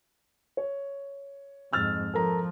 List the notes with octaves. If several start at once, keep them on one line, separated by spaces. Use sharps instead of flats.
C#5
F2 G#2 E6 F6 A6
F3 A4 A#4 A#5